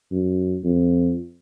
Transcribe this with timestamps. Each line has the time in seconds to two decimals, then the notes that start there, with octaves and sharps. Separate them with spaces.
0.12 F#2
0.64 F2